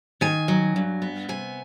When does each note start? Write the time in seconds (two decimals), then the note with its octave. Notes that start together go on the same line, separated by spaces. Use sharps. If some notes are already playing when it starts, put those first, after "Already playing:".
0.21 D#3 G#5
0.48 F#3
0.76 G2
1.02 B3
1.29 C3 G#5